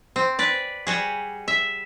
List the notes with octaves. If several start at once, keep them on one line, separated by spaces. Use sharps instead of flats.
C4
B4 D5
G3 F#4 G#4
E5